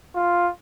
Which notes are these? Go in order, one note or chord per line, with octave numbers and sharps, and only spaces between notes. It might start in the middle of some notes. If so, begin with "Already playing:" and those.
F4